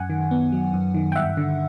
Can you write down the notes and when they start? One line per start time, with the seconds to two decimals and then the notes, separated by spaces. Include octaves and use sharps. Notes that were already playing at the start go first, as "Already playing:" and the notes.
Already playing: F#2 F#5 G#5
0.10 D#3
0.31 B3
0.52 F#3
0.74 F#2
0.94 D#3
1.12 G5
1.15 G2 E5 F#5
1.37 D3